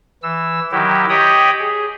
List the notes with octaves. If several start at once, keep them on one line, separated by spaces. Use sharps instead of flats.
E3 E6
D#3 F#3 E4 G4
G4 C#5 D#5 G5 B5 D#6
G#4